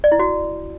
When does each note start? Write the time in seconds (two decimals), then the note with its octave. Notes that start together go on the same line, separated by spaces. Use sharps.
0.04 D5
0.12 E4
0.19 F#4